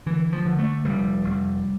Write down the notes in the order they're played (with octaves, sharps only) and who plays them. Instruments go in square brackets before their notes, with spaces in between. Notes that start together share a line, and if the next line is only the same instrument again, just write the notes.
[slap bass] D3 E3
F3
D3
A3
F1 G3
F1